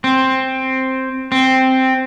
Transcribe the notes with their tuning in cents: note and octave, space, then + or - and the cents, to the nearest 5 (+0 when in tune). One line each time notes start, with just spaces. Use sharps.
C4 +5
C4 +0